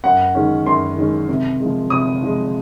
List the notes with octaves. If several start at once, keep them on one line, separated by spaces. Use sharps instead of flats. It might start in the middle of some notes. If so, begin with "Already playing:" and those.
F#2 F#5
D#3 G#3 C#4
F#2 C6
D#3 G#3 C#4
C3
F3 G#3
C3 D#6
F3 G#3